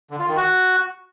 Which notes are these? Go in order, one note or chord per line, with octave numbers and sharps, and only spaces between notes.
D3
F4
D#3
F#4